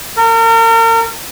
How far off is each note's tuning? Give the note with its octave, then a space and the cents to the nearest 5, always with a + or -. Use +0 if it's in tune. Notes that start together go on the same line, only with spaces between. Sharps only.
A#4 -40